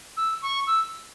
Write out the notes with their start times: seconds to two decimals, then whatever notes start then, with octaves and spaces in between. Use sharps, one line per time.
0.17 E6
0.42 C#6
0.67 E6